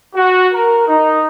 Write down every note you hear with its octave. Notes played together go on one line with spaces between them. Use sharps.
F#4
A#4
D#4